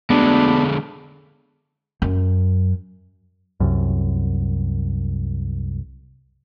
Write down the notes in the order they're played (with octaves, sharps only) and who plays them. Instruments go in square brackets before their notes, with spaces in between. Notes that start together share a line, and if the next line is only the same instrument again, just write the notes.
[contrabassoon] D2 [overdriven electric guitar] D3 G#3 [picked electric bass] B3 [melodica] D4 D5 B5
[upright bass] F#2
[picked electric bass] C2 F#2